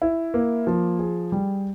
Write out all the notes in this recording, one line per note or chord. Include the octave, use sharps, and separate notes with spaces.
E4
A#3
F3
G#4
G3